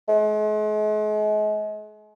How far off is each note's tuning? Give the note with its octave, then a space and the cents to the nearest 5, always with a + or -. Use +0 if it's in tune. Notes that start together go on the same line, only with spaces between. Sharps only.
G#3 +40